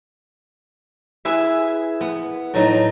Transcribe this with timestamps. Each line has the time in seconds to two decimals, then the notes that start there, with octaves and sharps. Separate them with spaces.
1.25 E4 G#4 B4 E5
2.01 B3
2.54 A2 F#3 D#4